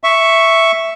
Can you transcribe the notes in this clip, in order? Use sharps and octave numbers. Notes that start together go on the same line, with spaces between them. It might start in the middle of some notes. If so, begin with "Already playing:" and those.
E5 C#6